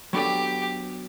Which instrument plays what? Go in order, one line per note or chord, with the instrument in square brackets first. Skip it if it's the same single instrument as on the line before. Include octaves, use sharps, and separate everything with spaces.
[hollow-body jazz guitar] F#3 B3 D4 A4 D5 [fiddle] G4